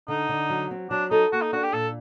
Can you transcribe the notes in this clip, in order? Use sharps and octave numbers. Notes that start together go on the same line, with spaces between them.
D3 D#4
D3
F#3
C4
F#3 D4
D#4 A4
A#3 F#4
D#4
D4 F#4
G4
A#2 A4